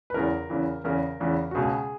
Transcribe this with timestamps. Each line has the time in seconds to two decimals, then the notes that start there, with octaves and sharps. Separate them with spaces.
0.10 B4
0.14 E2 C#3 E3 A#4
0.50 E2 C#3 E3
0.84 E2 C#3 E3 A#4
1.20 E2 C#3 E3
1.51 F#4
1.55 C#2 B2 G#4